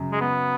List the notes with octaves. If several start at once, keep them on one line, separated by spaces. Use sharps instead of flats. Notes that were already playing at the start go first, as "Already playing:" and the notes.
Already playing: F#2 C#3
G#3
B3